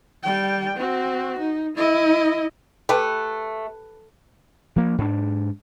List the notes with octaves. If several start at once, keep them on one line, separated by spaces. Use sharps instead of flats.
G3 G5
C4 F#4
D#4
E4 D#5
A3 G4 B4
F3 A#3
G#2 D4